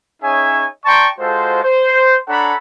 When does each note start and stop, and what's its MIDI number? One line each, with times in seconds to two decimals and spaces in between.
0.21 0.64 61
0.21 0.64 63
0.21 0.64 68
0.21 0.64 73
0.21 0.64 76
0.21 0.64 80
0.85 1.07 74
0.85 1.07 79
0.85 1.07 81
0.85 1.07 82
0.85 1.07 84
0.85 1.07 85
1.19 1.59 56
1.19 1.59 65
1.19 1.59 66
1.19 1.59 69
1.19 1.59 72
1.62 2.16 72
2.28 2.53 62
2.28 2.53 69
2.28 2.53 73
2.28 2.53 78
2.28 2.53 82
2.28 2.53 83